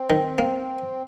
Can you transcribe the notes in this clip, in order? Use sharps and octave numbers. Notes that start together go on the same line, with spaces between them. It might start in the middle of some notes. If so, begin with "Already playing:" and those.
Already playing: C4
D#3
A#3